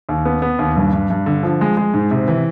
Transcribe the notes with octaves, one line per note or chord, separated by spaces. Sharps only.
D#2
B3
B3
D#2
G2
G2
G2
D3
F3
G#3
G#3
G#2
C3
E3